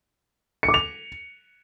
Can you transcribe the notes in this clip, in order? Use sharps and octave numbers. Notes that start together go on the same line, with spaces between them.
C#7
D6
F7